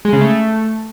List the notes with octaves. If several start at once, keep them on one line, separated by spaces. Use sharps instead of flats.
G#3
C#3
A3